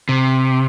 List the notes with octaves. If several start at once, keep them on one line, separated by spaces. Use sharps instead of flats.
C3